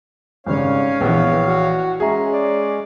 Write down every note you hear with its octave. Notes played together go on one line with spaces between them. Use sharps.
G#1 G2 C#3 C#4 C#5 F5
A#1 E3 B3
F#4
G#3 C#4 G#4 E5 A#5
D5